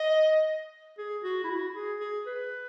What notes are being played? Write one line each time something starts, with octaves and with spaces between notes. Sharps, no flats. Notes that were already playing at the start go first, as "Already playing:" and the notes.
Already playing: D#5
G#4
F#4
E4
F#4
G#4
G#4
B4